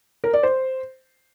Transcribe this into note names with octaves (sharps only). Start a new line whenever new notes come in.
A#4
D5
C5